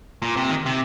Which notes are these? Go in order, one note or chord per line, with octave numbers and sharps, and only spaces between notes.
A#2
C3
D#3
C3